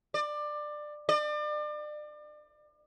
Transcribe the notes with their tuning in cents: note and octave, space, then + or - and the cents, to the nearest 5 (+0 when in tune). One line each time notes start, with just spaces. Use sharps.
D5 +20
D5 +35